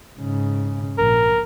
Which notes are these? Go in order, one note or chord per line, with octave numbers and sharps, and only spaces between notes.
G#2 C#3
A#1 A#4